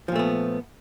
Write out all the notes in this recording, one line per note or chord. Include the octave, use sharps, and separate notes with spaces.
A#2 F3 A3 B3